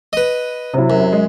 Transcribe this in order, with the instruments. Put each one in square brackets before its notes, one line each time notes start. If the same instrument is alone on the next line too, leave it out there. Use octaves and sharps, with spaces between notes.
[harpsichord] B4 D#5
[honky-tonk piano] C3 F#3 E4
[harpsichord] F#2
[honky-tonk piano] G#3